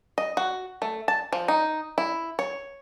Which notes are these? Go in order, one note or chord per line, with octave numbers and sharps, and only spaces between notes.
D#5
F#4
A3
A5
F3
D#4
E4
C#5